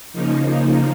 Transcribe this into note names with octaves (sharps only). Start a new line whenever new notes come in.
C#3 F3 A#3 D#4